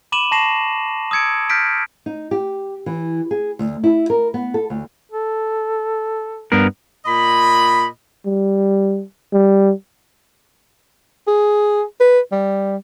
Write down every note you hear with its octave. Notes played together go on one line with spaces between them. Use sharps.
B5 D6 D#7 E7 F#7
A5 C#6 A#6 C7 E7 F#7
D#6 E6 G#6 C#7 D7
F6 G6 A#6 B6 D7
D#4
G4
E3
G#4
D2
E4
A#4
B3
A4
D2
A4
G2 B3 A#4
A#2 D#5 B5
G3
G3
G#4
B4
G3